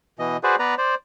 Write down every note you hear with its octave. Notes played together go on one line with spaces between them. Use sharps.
B2 E3 D#5
F#4 G#4 B4 C5 D5
B3 B4 D5 A#5
C5 D5